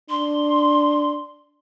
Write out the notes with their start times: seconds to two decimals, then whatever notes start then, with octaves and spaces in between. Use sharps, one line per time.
0.10 D4 C6